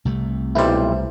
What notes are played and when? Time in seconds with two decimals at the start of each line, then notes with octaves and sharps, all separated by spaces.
0.05 C2 C3 A3
0.55 B1 G3 E4 C5